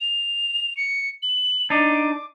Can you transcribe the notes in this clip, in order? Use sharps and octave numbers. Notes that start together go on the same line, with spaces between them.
F7
C#7
F#7
D4 D#4 D6